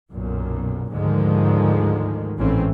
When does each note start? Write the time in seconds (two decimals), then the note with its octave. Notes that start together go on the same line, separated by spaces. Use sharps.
0.12 B1 F#2 A#2
0.93 D2 G#2 D3 D#3 F3 G#3
2.38 A1 G#2 E3 A3 C4 C#4